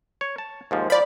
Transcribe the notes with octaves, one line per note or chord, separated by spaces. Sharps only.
C#5
A5
D#2 G#2 F3
F3 D5 B5